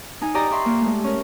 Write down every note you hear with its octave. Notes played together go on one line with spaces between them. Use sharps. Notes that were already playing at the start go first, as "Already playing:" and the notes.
D#4 G#5
G4 D5 D#5 A#5
D5 E5 C6 C#6
A#3
G#3 A3
C#4 A#4